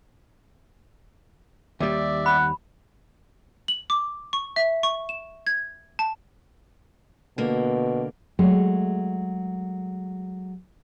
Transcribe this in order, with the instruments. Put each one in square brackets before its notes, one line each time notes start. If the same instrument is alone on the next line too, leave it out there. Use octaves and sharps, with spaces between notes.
[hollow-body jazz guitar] D#2 G3 [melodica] D5 E5
[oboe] F#5 [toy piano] B5
[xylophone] F#7
D6
C#6
E5
C#6
E7
G#6
A5
[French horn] B2 [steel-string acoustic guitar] D3 A#3
[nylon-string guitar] F#3 G#3 A3